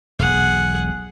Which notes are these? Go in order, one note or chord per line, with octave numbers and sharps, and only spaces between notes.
E1 B1 G#4 F#5